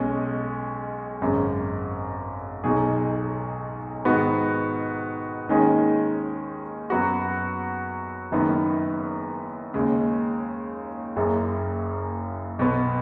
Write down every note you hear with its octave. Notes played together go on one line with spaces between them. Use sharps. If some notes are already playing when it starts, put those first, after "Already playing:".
Already playing: B1 B2 G#3 C#4 G#4
G#1 F#2 C#3
B1 B2 F#3 D#4 G#4
G#2 D#3 B3 F#4
D#2 D#3 G#3 C#4 G#4
F#2 F#3 B3 F#4
F#1 F#2 D#3 B3
D#2 C#3 G#3
F#1 F#2 C#3
B1 B2 B3